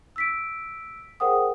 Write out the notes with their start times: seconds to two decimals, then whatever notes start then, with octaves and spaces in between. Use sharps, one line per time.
0.16 E6 B6 D7
1.20 G#4 A#4 C5 F#5 G5 D#6